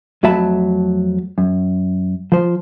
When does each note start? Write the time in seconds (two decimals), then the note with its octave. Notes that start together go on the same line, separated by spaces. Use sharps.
0.23 F2 F#3 A3 E5 A5 B5
1.38 F#2
2.32 F3 C5